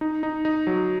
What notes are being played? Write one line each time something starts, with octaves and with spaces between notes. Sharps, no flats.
D#4
D#4
D#4
F#3